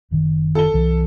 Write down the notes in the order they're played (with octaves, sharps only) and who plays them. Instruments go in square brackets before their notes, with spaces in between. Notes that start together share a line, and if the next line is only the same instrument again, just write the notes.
[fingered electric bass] F#1 D#3
[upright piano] A4 G7
[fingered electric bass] C2 E3